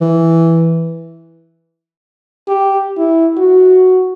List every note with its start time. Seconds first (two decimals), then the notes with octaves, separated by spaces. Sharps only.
0.01 E3
2.48 G4
2.97 E4
3.37 F#4